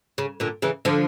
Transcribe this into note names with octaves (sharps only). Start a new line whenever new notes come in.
C#3
A#2 D3
C#3 E3
D3 F3